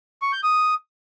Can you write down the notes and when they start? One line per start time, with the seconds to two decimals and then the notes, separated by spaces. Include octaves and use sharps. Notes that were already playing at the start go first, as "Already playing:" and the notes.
0.22 C#6
0.33 G6
0.43 D#6